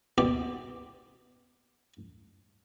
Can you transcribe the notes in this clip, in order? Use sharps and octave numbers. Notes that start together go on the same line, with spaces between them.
D#2 B2 B3 G4 D5 D6